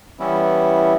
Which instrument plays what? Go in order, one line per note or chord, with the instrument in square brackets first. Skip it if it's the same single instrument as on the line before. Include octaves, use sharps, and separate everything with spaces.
[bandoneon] E3 G3 B3 C#4 E4